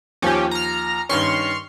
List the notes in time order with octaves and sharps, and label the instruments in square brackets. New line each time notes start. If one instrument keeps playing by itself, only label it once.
[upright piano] D#2 F3 [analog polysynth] C#4 G4
[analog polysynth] A#5 F6
[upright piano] G2 D#3 C#4 [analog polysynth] C6 C#6 F6